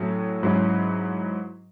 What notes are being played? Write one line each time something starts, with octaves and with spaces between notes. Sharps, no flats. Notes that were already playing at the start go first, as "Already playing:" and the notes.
Already playing: A2 F#3 A3 C#4 F#4
G#2 F#3 C#4 E4